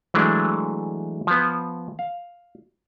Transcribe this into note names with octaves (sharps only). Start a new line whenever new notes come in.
E3 F#3 G#3 A3 D4
F3 B3
F5